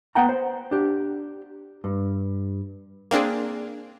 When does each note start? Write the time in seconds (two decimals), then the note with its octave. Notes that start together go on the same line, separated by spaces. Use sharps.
0.15 B3 F#5 G5 A#5
0.29 C5
0.71 D4 G4
1.84 G2
3.11 A#3 C4 D4 G#4